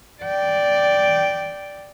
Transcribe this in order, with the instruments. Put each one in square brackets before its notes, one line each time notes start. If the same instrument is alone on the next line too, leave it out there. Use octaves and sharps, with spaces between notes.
[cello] D5 G5